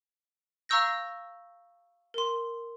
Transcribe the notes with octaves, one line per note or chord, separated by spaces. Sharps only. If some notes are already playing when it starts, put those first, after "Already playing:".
F5 A#5 C#6 E6 G6 A#6
A#4 C6